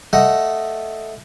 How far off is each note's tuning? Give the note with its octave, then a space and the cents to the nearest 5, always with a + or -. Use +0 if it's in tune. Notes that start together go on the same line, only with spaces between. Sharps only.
A3 +0 D#5 +0 F#5 +0